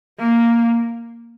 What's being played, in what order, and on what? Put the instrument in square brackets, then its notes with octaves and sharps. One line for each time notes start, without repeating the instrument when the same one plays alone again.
[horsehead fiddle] A#3